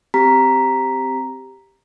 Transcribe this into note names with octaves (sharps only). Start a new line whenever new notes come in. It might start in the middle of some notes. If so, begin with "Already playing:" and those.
C4 G4 A#5 B6